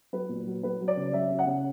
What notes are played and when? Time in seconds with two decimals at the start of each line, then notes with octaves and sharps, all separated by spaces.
0.13 F#3 B4
0.29 A#2
0.47 F#3
0.63 F#3 B4
0.80 F#3
0.88 D5
0.97 C#3
1.13 F#3 E5
1.30 C#3
1.39 F#5
1.46 C#3